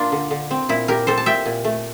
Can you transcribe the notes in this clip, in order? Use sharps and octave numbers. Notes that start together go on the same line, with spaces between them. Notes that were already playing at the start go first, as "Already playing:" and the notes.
Already playing: A#2 A#3 D4 F4
D3
D3
C4
A#2 E4
A#2 G4 A#4
C4 A4 C5
A5
A#2 E5 G5
A#2
A3